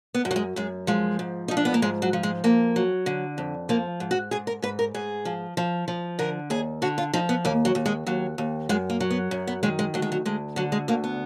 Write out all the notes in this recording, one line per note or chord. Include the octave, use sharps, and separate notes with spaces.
B3
F#2
F#3
G#3
F#2 G#3
F3 G#3
G#2
F3 D#4
D4
B3
A#3
G#2 G#3
F#3
F3
G#3
F2 A#3
F#3
D3
F2
F3 A#3
G#2
F#4
G#2 G#4
A#4
G#2 B4
A#4
G#2 G#4
F3
F3
F3
D3 A#4
D#2 G#4
D3 F#4
F4
F3 D#4
B3
D#2 A#3
F#3
D#2
G#3
D#2 F#3
D#2
F#2 G#3
A#3
F#3
B3
F#2
B3
D#3 G#3
G#3
D2 F#3
G#3
F#3
D2 G#3
D3 F#3
G#3
D2 A#3
B3